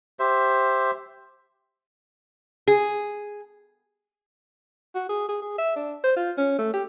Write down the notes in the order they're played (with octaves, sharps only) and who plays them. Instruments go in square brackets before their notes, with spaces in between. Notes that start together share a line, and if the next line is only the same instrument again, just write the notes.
[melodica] G4 C5 E5
[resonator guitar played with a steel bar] G#4
[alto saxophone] F#4
G#4
G#4
G#4
E5
D4
C5
F4
C#4
A3
G4